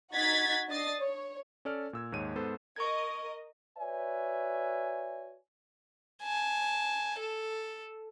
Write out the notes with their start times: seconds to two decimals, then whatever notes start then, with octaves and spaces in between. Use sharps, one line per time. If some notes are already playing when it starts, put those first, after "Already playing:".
0.14 D#4 F#4 F#5 G#6 A6 B6
0.68 D4 D#5 D#6 A6 C7
1.00 C#5
1.65 C#4 A4 D5 F6
1.93 A#2 E6 G#6
2.12 D#2 G#2 C#5 D#7
2.35 G#2 B3 A4 C5
2.76 A#4 D#5 C#6 G#6
3.79 F#4 B4 C#5 D5 E5 G#5
6.23 G#5 A5
7.18 A4